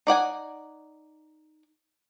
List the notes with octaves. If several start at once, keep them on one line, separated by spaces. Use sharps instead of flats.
D#4 D5 F#5 G#5